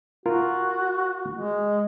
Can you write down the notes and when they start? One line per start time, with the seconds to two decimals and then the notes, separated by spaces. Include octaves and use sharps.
0.26 F4 F#4 A#4
1.34 G#3